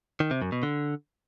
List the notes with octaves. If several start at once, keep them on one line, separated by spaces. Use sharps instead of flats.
D#3
C3
F#2
B2
D3